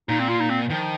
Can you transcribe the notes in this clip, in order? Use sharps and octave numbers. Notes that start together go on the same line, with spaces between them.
A#2 D#4
C4
F4
D#4
C4
D#3 F3